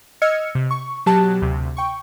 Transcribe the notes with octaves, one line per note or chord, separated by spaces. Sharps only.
D#5 E6 F6 G#6 C#7
C3
C#6
B2 F#3 G4 A5 F#6
D2 C3
G5 C#6